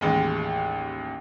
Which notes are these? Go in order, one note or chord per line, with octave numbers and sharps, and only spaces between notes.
A1 D#2 G#3